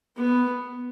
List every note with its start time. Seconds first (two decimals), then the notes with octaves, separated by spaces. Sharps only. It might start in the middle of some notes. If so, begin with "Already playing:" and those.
0.16 B3